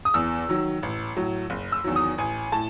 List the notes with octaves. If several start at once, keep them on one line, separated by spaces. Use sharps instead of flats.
D#6
E2 E6
D#3 F#3
A1
A2 F#3
F#1
E6
E2 D#3 F#3
D#6
A1 G#5
A2 A5